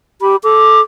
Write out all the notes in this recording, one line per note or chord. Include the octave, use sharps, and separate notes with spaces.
G4 B5
A4 D6